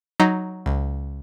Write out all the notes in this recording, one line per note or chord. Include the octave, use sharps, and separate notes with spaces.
F#3 D#4
C#2